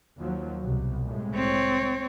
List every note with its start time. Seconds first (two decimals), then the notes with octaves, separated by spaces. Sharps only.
0.17 D#2 F3 F#3
0.60 C2 B2
1.06 C2 A2 G#3
1.35 C4 C#5